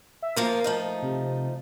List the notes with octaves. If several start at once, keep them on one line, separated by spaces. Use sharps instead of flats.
E5
F3 A#3 F4 A#4
F3 A3 D#4
C3